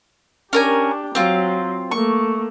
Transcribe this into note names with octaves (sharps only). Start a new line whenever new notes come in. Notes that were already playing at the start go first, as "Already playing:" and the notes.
C#4 D4 G4 A#4 G#5
F#3 C4 F4
A3 A#3 C#6